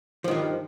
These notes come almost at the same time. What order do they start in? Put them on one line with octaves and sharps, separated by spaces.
F3 D#3 G2